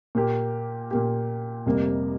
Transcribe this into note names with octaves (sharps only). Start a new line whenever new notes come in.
A#2 A#3 G4
A#2 A#3 G4
F1 F2 C3 G3 A#3